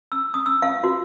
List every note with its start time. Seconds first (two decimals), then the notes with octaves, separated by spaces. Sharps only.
0.12 E6
0.34 D#6
0.46 E6
0.62 F5
0.84 F#4